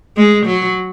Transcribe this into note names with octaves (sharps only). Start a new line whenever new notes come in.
G#3
F#3